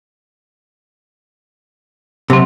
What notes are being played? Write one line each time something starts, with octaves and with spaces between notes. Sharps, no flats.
C3 F#3 C4